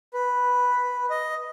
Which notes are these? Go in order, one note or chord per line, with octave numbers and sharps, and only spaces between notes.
B4
D#5